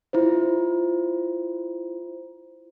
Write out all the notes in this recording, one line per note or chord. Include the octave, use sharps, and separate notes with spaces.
E4 F4 C5